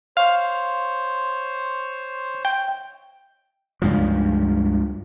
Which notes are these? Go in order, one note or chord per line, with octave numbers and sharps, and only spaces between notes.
C5 C#5 F5
G5
C#2 G2 F3